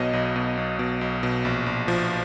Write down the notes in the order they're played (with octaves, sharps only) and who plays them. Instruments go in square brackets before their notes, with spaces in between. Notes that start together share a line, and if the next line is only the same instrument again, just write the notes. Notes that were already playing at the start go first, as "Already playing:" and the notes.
Already playing: [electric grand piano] B1 B2 C#5 D#5
B1
B2
B1
B2
B1
B2
A#1
A#1
F3